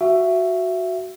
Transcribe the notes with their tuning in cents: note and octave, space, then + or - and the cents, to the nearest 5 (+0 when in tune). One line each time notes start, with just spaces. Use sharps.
F#4 +0 E5 +20